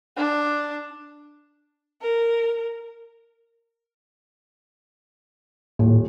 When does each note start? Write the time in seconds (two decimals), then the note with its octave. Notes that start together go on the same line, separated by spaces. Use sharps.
0.16 D4
2.01 A#4
5.79 D#1 A2